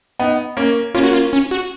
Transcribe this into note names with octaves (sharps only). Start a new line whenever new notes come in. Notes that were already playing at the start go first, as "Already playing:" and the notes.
B3 D#4
A#3 C#4
A#3 C#4 F4
F#4
F4
C#4
F#4